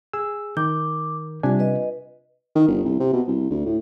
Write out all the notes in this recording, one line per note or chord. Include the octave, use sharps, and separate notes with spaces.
G#4 E6
D#3 A#4 D6 G6
C3 G3 D4 F4 G#5
B4 D#5
D#3
G1
C2
C3
B2
C2
D2
A2